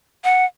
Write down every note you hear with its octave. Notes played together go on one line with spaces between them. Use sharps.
F#5